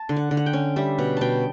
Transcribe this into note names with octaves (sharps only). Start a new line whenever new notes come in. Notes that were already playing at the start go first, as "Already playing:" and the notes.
Already playing: A5
D3
F#5
D3
F#5
G5
C#4
G3 E5
B2 F#5
B2 G5 A5